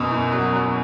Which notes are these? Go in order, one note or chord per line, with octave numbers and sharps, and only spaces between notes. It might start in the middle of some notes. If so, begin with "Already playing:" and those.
Already playing: F#2 B2
E2
F#3
F#3